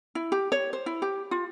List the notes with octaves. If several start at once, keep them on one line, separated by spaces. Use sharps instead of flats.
E4
G4
C#5
C5
E4
G4
F4